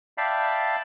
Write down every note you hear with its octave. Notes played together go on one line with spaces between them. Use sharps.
D5 E5 F5 G5 A5 B5